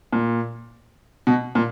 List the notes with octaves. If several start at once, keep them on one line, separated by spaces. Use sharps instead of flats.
A#2
B2
A#2